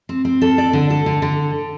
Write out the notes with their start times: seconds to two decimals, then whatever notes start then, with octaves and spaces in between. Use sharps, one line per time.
0.09 C4
0.25 C4
0.41 A4
0.58 D5
0.73 D3
0.90 A4
1.06 D3
1.22 D3